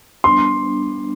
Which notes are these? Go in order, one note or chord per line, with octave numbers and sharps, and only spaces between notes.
G3 B3 D4 C6